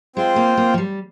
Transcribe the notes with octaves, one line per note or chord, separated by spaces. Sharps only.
G#3 C4 F4 C5 G5
A#3
A#3
F3
G3